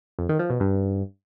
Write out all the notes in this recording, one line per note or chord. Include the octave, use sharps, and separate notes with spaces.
F2
D#3
F3
B2
G2